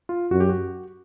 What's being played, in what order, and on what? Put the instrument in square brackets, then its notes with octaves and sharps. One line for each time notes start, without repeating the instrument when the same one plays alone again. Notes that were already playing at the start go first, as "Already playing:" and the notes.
[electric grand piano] F4
[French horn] F#2 [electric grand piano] F#4
[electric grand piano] G4
F#4